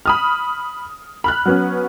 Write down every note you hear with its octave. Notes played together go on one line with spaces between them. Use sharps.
B5 D#6 F6
B5 F6 F#6
F#3 B3 C#4